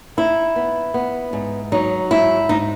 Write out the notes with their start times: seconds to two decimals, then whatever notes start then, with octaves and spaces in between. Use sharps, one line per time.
0.17 D#4 E4
0.56 B3
0.94 B3
1.33 G#2
1.72 F#3 D#4
2.11 G#2 E4
2.49 G#2 D#4